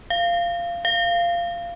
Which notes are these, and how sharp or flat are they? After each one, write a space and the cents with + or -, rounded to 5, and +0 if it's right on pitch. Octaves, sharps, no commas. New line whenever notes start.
F5 -15
F5 -15